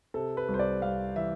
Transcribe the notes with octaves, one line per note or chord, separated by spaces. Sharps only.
C3 A4
B4
C2
C5
D5
C2 F5
E3 E5